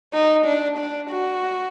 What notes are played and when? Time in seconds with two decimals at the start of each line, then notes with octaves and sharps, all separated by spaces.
0.14 D#4
0.45 D4
0.78 D4
1.10 F#4